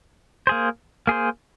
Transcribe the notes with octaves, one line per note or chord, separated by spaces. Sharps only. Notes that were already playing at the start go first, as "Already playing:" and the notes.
A#3 G#4 C5
A#3 G#4 C5